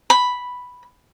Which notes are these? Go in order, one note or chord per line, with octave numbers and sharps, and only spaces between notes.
B5